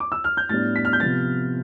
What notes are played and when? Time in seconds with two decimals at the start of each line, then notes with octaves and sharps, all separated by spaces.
0.00 D6
0.12 E6
0.24 F6
0.37 G6
0.49 A2 G3 B3 D4 A6
0.76 B6
0.85 F6
0.93 G6
1.00 C3 F3 B3 A6